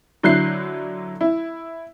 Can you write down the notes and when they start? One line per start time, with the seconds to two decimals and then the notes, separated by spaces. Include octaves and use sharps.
0.23 D3 F#3 E4 F#6 G6 C7
1.21 E4